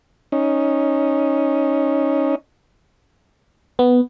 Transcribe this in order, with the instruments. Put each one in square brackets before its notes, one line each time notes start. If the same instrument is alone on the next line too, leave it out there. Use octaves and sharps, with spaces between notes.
[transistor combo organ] C#4 D#4
[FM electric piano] B3